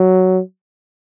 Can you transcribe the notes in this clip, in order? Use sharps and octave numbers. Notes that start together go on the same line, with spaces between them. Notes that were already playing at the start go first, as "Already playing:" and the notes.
Already playing: F#3